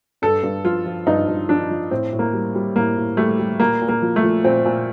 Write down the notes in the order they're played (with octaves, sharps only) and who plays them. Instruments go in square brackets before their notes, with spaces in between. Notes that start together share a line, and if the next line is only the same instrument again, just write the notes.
[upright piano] G2 A4
G2
F3 F4
F3
G2 D#4
G2
F3 D4
F3
A2 C4
A2
A#3
G3
G3
A2 A#3
A2
G3 A3
G3
A#2 A#3
A#2
A#3
F3
A3
F3
A#2 C4
A#2